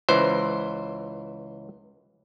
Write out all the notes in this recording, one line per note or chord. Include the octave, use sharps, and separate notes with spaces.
C#2 E3 C5